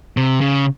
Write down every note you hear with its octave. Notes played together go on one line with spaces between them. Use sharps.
C3
C#3